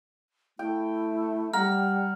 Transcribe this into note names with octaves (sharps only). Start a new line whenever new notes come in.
A3 E4 G5
G3 F#5 A#5 F6